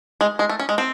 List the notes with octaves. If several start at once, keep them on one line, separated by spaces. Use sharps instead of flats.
G#3
G#3
A3
C#4
G#3
C4